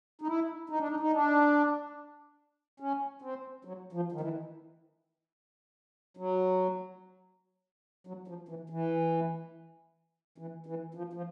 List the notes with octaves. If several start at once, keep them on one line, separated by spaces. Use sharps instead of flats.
D#4
E4
D#4
D4
D#4
D#4
D4
C#4
C4
F#3
F3
D#3
E3
F#3
F#3
F3
E3
E3
E3
E3
F3
F3